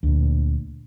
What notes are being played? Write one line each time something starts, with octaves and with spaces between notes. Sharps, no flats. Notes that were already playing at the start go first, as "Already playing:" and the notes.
D2 A#2